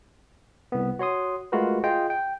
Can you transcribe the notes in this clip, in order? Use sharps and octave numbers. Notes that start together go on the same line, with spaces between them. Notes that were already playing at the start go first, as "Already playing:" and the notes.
C2 B3
F#4 C#5 C6 D#6
G#3 A3 F4 F#4 A#4 B4
F4 G#4 D#5 G5
G5